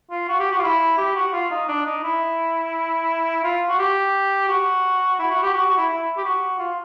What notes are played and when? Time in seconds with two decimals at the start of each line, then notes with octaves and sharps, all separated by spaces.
0.10 F4
0.28 F#4
0.40 G4
0.51 F#4
0.59 F4
0.63 E4
0.98 G4
1.16 F#4
1.33 F4
1.51 D#4
1.68 D4
1.86 D#4
2.03 E4
3.44 F4
3.69 F#4
3.79 G4
4.49 F#4
5.19 E4
5.30 F#4
5.43 G4
5.54 F#4
5.66 F#4
5.77 E4
5.89 E4
6.17 G4
6.24 F#4
6.59 F4